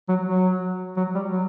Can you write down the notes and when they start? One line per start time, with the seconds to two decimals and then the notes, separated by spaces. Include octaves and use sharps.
0.09 F#3
0.26 F#3
0.97 F#3
1.15 G3
1.32 F#3